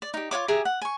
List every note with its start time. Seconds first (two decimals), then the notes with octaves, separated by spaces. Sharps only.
0.02 D5
0.14 D#4 G4
0.31 F4 F#4 C#5 D6
0.48 G4 G#4 E5 A#5
0.65 F#5
0.81 G#5 C#6